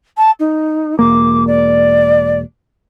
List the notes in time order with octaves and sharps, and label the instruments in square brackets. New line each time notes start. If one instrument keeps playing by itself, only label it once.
[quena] A5
D#4
[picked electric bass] E1 A#3 [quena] D6
[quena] D5